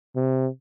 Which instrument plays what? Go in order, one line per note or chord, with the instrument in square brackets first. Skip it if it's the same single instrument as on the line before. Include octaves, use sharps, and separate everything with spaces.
[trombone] C3